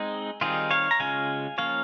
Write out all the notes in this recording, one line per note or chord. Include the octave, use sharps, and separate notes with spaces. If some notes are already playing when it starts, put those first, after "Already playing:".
Already playing: G#3 C4 D#4 G#4
D#3 G3 C4 D#4 F4 G#4
C#5 F5
A#5
C#3 G#3 C#4 F4 F5 G#5
F3 A#3 C#4 F4 C#5 F5